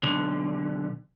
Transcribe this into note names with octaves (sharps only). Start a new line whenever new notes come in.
B1 D3